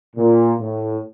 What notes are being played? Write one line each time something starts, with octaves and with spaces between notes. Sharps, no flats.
A#2
A2